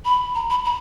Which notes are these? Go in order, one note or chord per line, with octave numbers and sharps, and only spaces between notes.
B5
A#5
B5
B5